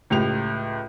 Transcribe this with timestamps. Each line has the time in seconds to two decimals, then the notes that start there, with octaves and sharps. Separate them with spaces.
0.10 C#2 A2 G4 F7